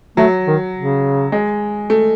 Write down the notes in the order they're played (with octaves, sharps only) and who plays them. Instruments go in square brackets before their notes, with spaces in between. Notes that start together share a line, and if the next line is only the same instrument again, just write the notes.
[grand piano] F#3 [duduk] A3
[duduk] D#3
C#3
[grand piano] G#3
A3